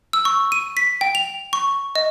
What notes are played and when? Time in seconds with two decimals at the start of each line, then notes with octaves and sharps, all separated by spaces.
0.13 E6
0.25 C#6
0.52 D#7
0.77 B6
1.01 G5
1.15 F7
1.53 C#6
1.96 D#5